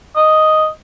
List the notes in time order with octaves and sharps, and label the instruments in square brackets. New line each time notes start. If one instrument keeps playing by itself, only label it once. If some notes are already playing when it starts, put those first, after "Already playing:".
[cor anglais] D#5